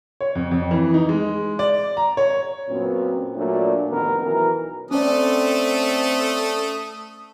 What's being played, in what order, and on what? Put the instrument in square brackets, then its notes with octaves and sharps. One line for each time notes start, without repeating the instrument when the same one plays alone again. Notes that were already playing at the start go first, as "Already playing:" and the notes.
[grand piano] C#5
F2
F2
E3
D#4
G#3
D5
A#5
C#5
[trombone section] F#2 A#2 B3 C4
A#2 F#3 A3 D4
A1 F2 D#3 B3 A#4
B1 E3 A#4
[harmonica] A3 A4 D#6 [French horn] C4 [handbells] C#4 D5